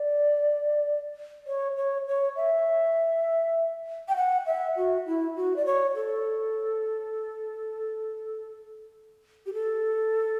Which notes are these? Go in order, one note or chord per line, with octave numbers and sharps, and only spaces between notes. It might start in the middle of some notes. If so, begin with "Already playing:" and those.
Already playing: D5
C#5
C#5
C#5
E5
G5
F#5
E5
F#4
E4
F#4
D5
C#5
A4
G4
A4